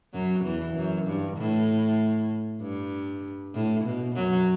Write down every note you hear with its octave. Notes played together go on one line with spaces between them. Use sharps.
F#2 F#3
E2 E3
F#2
G2
A2
G2
A2
B2
F#2 F#3